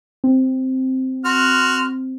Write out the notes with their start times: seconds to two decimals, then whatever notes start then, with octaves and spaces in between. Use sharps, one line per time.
0.24 C4
1.25 F#4 C6 F6